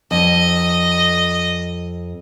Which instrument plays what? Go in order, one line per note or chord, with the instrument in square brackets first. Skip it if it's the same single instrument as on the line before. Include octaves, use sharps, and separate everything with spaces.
[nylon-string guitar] F2 [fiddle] D#5